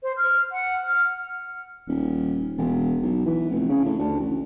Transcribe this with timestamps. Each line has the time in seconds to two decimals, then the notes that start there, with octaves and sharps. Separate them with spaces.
0.03 C5
0.17 F6
0.52 F#5
0.88 F6
1.88 D#1
2.57 E1
3.02 B1
3.26 E3
3.50 F1
3.69 C#3
3.85 A2
3.98 D2
4.20 A1